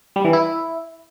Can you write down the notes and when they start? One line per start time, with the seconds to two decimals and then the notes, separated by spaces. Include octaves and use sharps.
0.16 G3
0.25 E3
0.33 E4